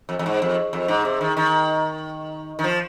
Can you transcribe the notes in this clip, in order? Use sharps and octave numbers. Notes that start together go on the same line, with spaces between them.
F2
F2
G#2
F2
F2
G#2
C3
D#3
D#3
D#3
F3